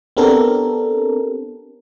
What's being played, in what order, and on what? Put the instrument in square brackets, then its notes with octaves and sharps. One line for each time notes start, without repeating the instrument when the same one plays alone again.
[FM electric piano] B3 C4 D4 G4 A4 A#4